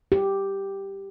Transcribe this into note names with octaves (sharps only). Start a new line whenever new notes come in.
G4